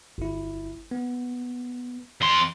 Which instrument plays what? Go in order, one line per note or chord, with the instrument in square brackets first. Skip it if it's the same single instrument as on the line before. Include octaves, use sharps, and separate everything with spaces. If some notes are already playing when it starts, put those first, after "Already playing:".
[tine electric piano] G1 E4
B3
[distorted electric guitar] F2 C6